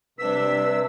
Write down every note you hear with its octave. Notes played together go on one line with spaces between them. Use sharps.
C3 G3 D4 B4 E6 B6